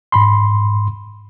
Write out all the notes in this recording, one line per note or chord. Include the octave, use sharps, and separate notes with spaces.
G#2 B5 C6